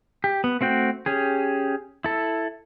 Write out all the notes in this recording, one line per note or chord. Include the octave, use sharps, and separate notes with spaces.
G4
B3
A3 C4 F#4 G5
C#4 G4 G#4
E4 A4